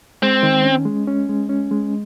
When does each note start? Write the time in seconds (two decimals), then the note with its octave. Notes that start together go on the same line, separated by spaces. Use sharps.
0.23 G#3 C4
0.43 D#3
0.65 C#4
0.85 G#3
1.07 C#4
1.29 G#3
1.49 C#4
1.71 G#3